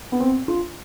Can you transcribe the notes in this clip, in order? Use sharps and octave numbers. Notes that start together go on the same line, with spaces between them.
B3
C4
F4